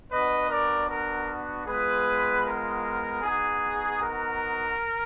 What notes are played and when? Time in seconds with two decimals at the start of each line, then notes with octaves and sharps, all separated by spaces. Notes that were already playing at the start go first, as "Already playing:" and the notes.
0.11 B3 D4 F#4 B4 D#5
0.50 A#4 D5
0.89 A#4
1.66 G#3 B3 F4 G#4 B4
2.44 A#4
3.22 B3 D#4 F#4 G#4
4.00 A#4